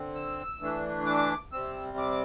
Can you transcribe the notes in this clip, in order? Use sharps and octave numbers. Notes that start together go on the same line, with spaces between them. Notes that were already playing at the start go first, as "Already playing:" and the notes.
Already playing: D3 C4
E6
E3 A3 D4
D6
C3 G3 C4 E6
D6